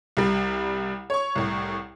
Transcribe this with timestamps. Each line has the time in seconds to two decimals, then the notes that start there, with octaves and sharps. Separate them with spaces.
0.17 C2 G3
1.10 C#5 C#6
1.35 C2 A2